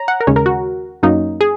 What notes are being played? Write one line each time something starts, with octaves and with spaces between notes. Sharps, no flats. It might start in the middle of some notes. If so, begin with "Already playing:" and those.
Already playing: C#5 A#5
F#5
A#4
D#2 C#3 G#3 C#4 C#5
A#4
F#4
F#2 F#3 A#3 C#4 D#4
G#4